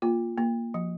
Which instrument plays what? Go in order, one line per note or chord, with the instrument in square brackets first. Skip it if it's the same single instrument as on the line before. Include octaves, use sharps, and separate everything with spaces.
[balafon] A#3 F4
A#3
F3